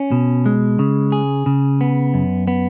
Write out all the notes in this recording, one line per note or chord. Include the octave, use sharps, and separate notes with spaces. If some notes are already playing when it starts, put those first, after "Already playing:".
Already playing: C#4
B2
G#3
C#3
G#4
C#3
B3
F#2
B3